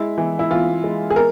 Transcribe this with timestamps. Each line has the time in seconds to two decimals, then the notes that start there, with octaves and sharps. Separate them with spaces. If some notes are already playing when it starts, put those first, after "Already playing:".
Already playing: G#3 E4
0.18 E3
0.39 E4
0.50 E3 F4
0.84 G#3
1.10 G#4
1.16 A#4